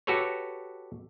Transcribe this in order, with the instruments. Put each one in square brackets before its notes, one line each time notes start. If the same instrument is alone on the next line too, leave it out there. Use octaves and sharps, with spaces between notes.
[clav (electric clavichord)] F#4 G4 A4 B4 C#5